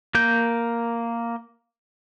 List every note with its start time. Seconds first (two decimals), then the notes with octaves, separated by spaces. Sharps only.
0.15 A#3 A#4 G6